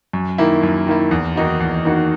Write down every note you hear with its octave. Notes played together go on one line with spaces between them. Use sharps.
F#2
D#3 A#3 E4
F#2
D#3 A#3 E4
E2
D#3 A#3 D#4 F#4
E2
D#3 A#3 D#4 F#4